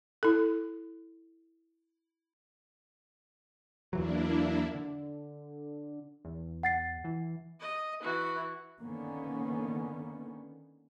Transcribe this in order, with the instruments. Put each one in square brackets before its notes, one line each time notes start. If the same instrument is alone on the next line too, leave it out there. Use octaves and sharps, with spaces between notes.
[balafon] E4 A4
[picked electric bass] E2 E3 F#3 [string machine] A#3 D4 E4
[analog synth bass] D3
E2
[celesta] F#5 A6 C7
[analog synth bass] E3
[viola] D#5
E3 F#4
[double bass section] D3 D#3 A#3 B3 C#4